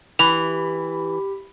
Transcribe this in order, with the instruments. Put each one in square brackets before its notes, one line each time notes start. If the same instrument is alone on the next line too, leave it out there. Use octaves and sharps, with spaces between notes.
[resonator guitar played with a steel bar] E3 [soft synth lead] G4 [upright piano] B5 [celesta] F7